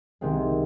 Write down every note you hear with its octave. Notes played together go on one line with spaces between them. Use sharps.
C2 C3 D#3 G#3 C4